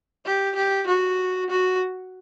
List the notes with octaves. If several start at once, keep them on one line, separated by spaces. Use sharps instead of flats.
G4
G4
F#4
F#4